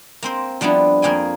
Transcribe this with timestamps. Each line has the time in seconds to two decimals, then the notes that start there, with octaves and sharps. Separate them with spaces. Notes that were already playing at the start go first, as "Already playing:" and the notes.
0.23 A#3 C4 C5
0.61 F3 G3 B3 D4 E4
1.02 F2 A#3 G#4 G5 G#5